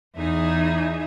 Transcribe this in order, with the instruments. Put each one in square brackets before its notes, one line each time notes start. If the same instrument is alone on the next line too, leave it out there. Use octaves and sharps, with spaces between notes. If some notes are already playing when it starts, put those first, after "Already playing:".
[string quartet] E2 D#4 G#4 E5